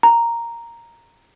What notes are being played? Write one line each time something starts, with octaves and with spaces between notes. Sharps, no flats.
A#5